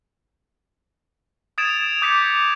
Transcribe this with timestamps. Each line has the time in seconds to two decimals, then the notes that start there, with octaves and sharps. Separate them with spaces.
1.58 D#6 G#6 A6 D7 E7 F7
2.02 D6 D#6 G6 G#6 B6 C#7